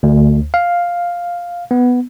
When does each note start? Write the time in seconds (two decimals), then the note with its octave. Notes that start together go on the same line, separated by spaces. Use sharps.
0.03 D2
0.54 F5
1.71 B3